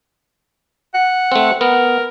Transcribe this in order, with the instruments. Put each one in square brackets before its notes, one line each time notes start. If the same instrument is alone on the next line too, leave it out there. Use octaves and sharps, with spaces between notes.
[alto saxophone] F#5
[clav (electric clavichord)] A3 C4
[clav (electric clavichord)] B3 [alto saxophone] A#4